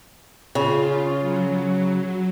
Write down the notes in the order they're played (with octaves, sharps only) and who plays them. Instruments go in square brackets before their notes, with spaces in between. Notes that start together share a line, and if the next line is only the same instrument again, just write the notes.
[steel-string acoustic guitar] C#3 [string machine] F4
[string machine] F#3